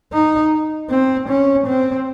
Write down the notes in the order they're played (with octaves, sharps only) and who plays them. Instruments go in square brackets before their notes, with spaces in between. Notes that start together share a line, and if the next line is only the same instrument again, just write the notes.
[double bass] D#4
C4
C#4
C4